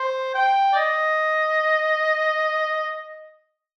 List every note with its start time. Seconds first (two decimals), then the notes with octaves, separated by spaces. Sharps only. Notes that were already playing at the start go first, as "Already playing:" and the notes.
Already playing: C5
0.35 G5
0.73 D5
0.76 D#5